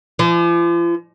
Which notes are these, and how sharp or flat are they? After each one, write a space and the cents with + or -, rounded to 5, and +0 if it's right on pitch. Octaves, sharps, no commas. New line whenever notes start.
F3 -40